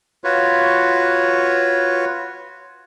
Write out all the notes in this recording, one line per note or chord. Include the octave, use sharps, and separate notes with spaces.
F4 F#4 B4 C#5